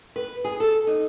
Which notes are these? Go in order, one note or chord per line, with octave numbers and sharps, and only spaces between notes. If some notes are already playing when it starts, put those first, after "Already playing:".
B4
G#4
A4
D#4